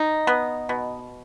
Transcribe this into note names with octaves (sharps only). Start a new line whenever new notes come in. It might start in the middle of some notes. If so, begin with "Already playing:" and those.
Already playing: D#4
B3
B2